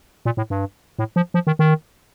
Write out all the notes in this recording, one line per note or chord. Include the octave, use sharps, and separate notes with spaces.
A#2
A2
G2
A2
F3
F3
D#3
D#3